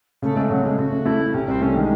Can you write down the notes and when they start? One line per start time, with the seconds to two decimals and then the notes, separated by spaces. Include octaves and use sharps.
0.22 C#3 A3
0.36 G#3 A3
0.50 C#3 F#3
0.64 G#3 A3
0.78 C#3 F#4
0.92 A3
1.06 A3 E4
1.20 A3
1.34 C3 C#4
1.48 C2 C4
1.61 A3 C#4
1.75 D#3 G#3